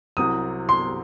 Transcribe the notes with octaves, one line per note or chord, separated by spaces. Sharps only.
C2 C3 F#3 C4 E4 D#6
C6